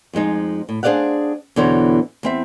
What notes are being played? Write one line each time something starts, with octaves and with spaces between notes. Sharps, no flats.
F2 F3 G#3 D#4
A2
D4 G#4 C5 D5 F5 F#5
E2 B2 D3 E3 C5 C#5
E2 C4 E5